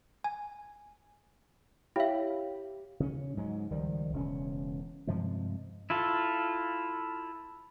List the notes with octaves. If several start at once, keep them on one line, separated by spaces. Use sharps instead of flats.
G#5
E4 G4 C#5 E5 F5 G5
C#3 C#4
G#2 F#3 G#3
C#2 D#3 F3 G3
E1 C#3 C#4
G2 C3 F3 G#3
E4 F4 A4